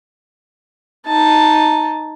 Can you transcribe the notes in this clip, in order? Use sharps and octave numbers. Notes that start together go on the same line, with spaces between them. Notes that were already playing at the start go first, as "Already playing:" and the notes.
D#4 A5